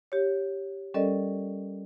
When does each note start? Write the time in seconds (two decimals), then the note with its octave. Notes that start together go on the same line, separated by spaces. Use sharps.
0.12 G4 C#5
0.94 G3 C#4 A4 A#4 D5 D#5